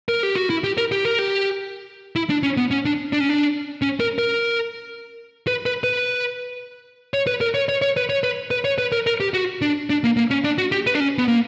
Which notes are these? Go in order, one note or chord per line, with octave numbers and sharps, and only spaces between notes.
A#4
G4
F#4
E4
G4
A#4
G4
A#4
G4
E4
D4
C#4
B3
C#4
D4
D4
C#4
D4
C#4
A#4
A#4
B4
B4
B4
C#5
B4
A#4
C#5
C#5
C#5
B4
C#5
B4
B4
C#5
B4
A#4
A#4
G4
F#4
D4
D4
A#3
A#3
C#4
D4
F#4
G4
B4
D4
C#4
B3
A#3